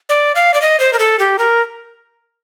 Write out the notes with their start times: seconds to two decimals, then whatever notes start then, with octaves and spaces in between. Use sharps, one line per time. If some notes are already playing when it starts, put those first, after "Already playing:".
0.09 D5
0.35 F5
0.54 D5
0.62 D#5
0.80 C5
0.93 A#4
0.99 A4
1.19 G4
1.39 A#4